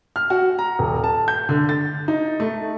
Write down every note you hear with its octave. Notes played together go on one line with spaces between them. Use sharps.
F6
F#4
A#5
D#1
A5
G6
D3
A6
D#4
A3